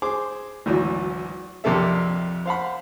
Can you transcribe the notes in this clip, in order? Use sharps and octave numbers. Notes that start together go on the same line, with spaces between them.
G#4 C5 D6
G#1 D2 E3 F#3
A#1 F2 C3 A#3 A4 E5
C5 F5 F#5 B5